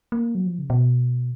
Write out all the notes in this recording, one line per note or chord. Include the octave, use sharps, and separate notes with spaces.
A#3
F#3
F3
C#3
B2